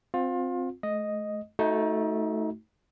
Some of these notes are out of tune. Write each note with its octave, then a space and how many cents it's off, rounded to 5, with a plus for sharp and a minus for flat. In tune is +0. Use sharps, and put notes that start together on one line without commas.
C4 +0 F4 +30
A3 -35 D#5 +0
A3 +0 D#4 +25 F#4 +0